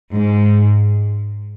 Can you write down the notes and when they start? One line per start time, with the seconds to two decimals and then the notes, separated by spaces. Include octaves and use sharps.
0.13 G#2